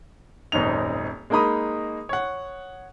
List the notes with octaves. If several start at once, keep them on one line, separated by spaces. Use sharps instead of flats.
D#1 G#1 F#2 D#4 F7
G#3 A#3 D#4 A#5 B5 D#6
C#5 F#5